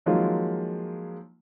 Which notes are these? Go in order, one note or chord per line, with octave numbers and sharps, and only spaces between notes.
D#3 F3 F#3 G#3 A#3 F4